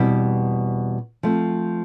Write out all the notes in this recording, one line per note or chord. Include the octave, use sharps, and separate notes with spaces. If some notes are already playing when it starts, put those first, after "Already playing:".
Already playing: E2 B2 G3 C4 E4
F3 A3 C4